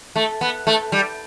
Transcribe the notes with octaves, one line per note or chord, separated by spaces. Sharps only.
A3
B3
A3
G3